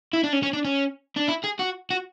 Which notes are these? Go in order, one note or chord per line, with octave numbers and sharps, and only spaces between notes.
E4
D4
C#4
C#4
D4
C#4
D4
E4
G#4
F#4
F#4